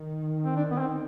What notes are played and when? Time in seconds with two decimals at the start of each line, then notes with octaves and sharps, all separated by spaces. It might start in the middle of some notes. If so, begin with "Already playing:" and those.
Already playing: D#3
0.45 C4
0.56 D4
0.71 B3
0.78 C4